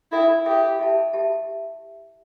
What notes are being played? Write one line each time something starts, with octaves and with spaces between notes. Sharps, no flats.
E4 A4 E5 G5
G4 A4 E5 G5
G4 E5 A5
G4 E5 A5